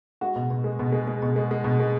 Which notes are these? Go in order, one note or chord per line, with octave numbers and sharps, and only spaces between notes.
G#3 F#4
B2
B2
G#3
B2
G#3
G#3
B2
G#3
G#3
B2
G#3